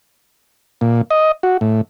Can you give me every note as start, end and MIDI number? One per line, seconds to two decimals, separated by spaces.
0.81 1.01 46
1.10 1.32 75
1.43 1.57 66
1.61 1.81 45